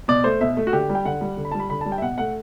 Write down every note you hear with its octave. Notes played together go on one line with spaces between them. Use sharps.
B2 D5
A3 C5
B2 E5
A3
F#4
D3 G4
G3
G5
D3 F#5
G3
D3
B5
A5
G3
B5
D3 B5
G3 A5
G5
E5
B2 F#5
A3 F#5